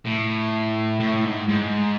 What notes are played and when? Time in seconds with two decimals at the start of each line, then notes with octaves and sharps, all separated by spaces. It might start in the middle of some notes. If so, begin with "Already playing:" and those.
0.05 A2
1.00 A2
1.25 G#2
1.48 G#2